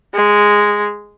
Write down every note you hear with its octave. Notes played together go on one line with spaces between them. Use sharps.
G#3